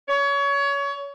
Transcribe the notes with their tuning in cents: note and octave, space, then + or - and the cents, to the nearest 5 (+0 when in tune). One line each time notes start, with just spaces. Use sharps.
C#5 +25